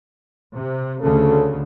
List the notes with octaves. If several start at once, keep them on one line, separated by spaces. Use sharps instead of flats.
C3
D2 C#3 A4